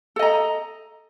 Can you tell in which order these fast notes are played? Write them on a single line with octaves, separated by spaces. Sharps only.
A4 D#5 A#5